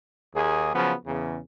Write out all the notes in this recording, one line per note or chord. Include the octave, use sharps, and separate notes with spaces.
D#2 G#4
C#3 F3 F#3 B3
E2 C#3